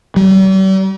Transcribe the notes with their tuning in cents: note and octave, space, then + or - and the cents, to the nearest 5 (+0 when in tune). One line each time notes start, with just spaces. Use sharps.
G3 -45